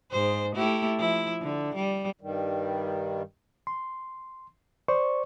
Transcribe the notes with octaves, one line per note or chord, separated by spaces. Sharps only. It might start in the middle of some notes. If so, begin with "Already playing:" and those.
G#2 C5
A3 E4 G4
F3 E4
D3
G3
G2 D#3 G3
C6
C5 D5 C#6